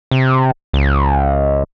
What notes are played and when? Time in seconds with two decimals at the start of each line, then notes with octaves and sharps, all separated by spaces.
0.11 C3
0.73 C#2